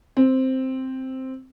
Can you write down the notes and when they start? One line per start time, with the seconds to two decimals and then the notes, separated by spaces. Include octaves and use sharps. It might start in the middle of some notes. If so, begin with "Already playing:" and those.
0.17 C4